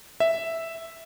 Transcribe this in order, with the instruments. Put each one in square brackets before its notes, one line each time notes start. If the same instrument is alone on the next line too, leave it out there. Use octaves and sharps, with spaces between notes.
[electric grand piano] E5